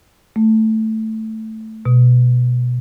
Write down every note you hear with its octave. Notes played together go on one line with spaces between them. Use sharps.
A3
B2